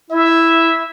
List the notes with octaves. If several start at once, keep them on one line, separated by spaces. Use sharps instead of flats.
E4 E5